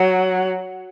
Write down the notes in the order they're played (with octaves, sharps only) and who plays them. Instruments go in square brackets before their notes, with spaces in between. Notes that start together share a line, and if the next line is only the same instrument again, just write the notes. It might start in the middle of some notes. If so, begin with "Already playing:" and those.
Already playing: [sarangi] F#3